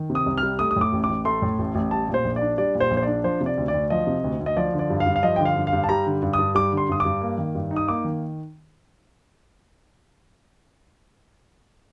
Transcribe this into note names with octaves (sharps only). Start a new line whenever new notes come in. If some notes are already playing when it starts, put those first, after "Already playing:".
Already playing: D#3
C3
D#6
C2
F6
G3
A3 D#6
D#6
A2
D6
A1
D6
A1
A3 C6
A2
A1
A1
G3 A5
A#2
C5
A#1
D5
D4
G3 D5
A#2
C5
A#1
C5
D4 D5
F3 C5
C3
D5
D2
D5
D2
F3 D#5
C3
D2
D2
D#5
F3 D5
D3
D5
G2
F5
G2
F5
F3 D#5
D3 G5
F5
G2
F5
G2
A5
G3 A#5
D3
G2
D#6
G2
G3 D6
D3
C6
G2 D#6
G2 D6
A#3
D#3
G2
D#4
D#6
A#3 D6
D#3